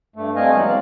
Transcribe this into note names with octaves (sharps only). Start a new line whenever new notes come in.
G2 A3
G3 A3 C4 D#5 F5 G#5
E3 F#3 G#3 B3
C4 D5 F5